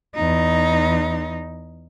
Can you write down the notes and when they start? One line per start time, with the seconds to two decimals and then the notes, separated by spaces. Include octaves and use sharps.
0.16 E2 D#4